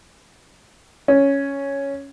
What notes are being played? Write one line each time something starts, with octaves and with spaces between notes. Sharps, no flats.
C#4